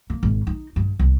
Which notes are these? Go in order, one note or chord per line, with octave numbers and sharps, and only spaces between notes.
A#3
G#1
D#4
G2
C2